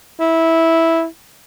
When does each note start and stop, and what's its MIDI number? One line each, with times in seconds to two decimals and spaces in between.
0.20 1.05 64